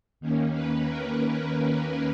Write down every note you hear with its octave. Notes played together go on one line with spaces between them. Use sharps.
D#2 D#3 A#3 C#4
B4
A#4